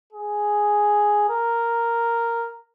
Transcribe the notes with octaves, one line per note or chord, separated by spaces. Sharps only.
G#4
A#4